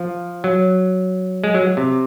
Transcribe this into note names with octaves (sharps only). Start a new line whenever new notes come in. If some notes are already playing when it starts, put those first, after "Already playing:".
Already playing: F3
F#3
G#3
F#3
C3